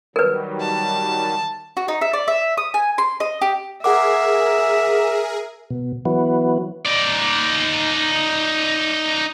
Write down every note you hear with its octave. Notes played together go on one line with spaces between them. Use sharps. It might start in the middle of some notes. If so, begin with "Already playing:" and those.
D#3 F#3 G3 A#4 B4
A5
F#4
D#4
E5
D5
E5
D#6
G#5
C6
D#5
G4
G#4 A#4 E5 F#5 D6
B2
E3 F#3 B3
D#4 D5